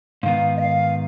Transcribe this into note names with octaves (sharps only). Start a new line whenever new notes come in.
G#2 D#3 B3 F5
D#5
F5